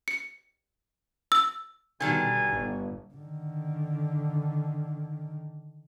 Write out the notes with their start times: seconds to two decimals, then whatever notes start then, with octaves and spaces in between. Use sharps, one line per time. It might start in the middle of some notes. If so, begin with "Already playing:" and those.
0.08 C#7
1.32 E6
2.00 B2 D3 D#3 G3 G#5
2.47 G1
3.14 D3 D#3